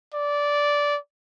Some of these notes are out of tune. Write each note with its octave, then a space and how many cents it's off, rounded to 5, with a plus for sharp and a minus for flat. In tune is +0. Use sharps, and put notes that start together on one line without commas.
D5 -15